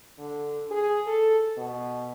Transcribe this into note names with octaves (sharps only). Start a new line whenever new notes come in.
D3
G#4
A4
B2